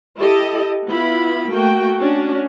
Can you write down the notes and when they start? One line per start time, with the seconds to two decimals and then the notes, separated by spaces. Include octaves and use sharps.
0.18 E4 G4 A4 D#5
0.87 B3 E4 F4 B5
1.50 A3 A#3 F#4 G5
2.00 C#4 D4 F#4